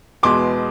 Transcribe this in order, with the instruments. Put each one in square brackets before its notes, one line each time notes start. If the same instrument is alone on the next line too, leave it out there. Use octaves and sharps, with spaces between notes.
[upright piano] E2 B2 G#3 C6 D6